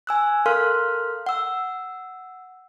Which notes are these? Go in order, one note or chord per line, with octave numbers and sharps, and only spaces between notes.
G#5 E6 F#6
A4 A#4 F5 C6 F6 F#6
F#5 E6